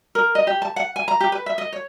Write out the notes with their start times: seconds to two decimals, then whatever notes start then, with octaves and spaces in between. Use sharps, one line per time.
0.15 A#4
0.35 D#5
0.47 G4
0.62 A5
0.76 F#5
0.96 G#5
1.08 A#5
1.20 G4
1.32 B4
1.46 E5
1.58 D#5
1.73 C#5